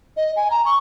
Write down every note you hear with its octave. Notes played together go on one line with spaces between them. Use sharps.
D#5
G#5
A#5
C#6